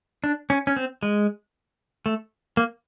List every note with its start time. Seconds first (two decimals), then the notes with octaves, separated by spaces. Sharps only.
0.24 D4
0.50 C#4
0.67 C#4
0.76 C4
1.03 G#3
2.06 A3
2.57 A#3